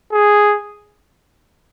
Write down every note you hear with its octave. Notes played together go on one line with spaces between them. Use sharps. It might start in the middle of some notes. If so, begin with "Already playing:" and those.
G#4